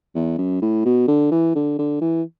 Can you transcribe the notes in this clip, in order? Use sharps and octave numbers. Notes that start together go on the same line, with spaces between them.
E2
F#2
A2
B2
D3
E3
D3
D3
E3